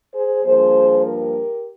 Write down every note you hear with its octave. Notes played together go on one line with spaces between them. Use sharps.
G#4 C5
G2 F3 A#3 G#4 C5
G4 A#4